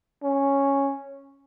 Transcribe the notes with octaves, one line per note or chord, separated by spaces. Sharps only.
C#4